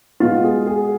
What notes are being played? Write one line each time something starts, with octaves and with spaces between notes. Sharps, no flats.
B2 G#3 B3 F4
G#4
G#4